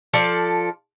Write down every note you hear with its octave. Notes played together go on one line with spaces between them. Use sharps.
F3 A4 D5